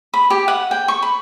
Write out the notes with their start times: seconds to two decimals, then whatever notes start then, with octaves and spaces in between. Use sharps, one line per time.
0.14 B5
0.30 G4
0.48 F#5
0.71 G5
0.88 C#6
1.02 B5